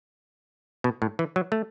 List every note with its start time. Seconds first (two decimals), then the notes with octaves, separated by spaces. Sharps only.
0.84 B2
1.02 A2
1.19 E3
1.36 F#3
1.52 A3